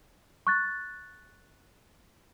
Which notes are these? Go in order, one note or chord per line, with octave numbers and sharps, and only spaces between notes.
C#6 F#6 A6